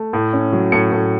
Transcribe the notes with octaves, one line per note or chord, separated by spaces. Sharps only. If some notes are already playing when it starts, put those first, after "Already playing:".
Already playing: A3
A2
C#4
F#3
A2 C#7
A2